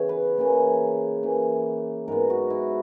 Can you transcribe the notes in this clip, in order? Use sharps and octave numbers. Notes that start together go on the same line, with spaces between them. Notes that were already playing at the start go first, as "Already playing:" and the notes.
Already playing: C#3 E3 B3 C#5
B4
C#3 E3 A#3
C#3 E3 A#3
G#2 F#3 B3 A#4
F#4
E4